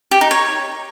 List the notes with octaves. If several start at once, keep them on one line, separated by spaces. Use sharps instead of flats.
G4
D#4
C#5